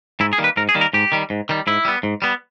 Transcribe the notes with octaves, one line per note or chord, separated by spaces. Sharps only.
G#2 E4
G#4
D#3 G3 A#3
B4
G#2 A#4
G#4
D#3 G3 A#3
A#4
G#2 G4
D#3 G3
G#2
D#3 G3
G#2 E4
G3 B3
G#2
G3 B3